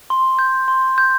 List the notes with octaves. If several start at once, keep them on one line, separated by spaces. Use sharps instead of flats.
C6
G6
C6
G6